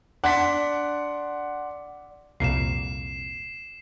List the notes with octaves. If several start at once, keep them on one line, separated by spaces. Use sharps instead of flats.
D4 F#5 C6 B6
C2 F2 A#2 C7 E7